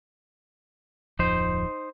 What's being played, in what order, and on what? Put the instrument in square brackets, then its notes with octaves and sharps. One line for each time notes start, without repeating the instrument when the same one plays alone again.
[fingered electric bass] D1 F2 F3 [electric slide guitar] D#4 C5